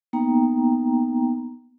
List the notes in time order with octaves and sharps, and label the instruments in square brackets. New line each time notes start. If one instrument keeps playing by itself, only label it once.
[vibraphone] A#3 B3 D#4 G5 A#5